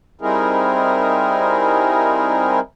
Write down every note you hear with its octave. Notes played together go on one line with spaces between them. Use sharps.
G3 C4 D#4 E4 G#4 A#4